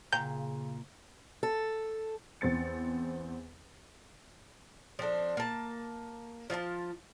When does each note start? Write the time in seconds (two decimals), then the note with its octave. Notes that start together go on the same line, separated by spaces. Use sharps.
0.13 A#2 C#3 G5 A#5 G6
1.43 A4
2.41 E2 C4 A6 C#7
4.99 F3 C4 D4 A4
5.37 A#3 A5
6.50 F3 F4 D#5 A5